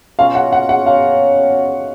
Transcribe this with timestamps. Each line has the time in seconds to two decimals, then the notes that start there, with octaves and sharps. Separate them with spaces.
0.19 B2 F#3 C#4 F4 F5
0.35 F#5
0.53 F#5
0.69 F#5
0.86 B2 F#3 C#4 F4 F5